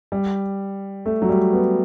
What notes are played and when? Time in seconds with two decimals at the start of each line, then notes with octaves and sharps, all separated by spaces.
0.12 G3
1.06 A3
1.22 F#3
1.29 G3
1.53 B3